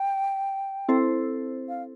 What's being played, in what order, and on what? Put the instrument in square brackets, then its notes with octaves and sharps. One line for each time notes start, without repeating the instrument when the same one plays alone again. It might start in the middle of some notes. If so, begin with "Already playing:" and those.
Already playing: [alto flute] G5
[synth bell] C4 E4 A4 C5
[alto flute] F5